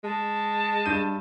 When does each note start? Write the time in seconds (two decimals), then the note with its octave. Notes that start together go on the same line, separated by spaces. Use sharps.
0.04 G#3 A5
0.85 G2 G6 D#7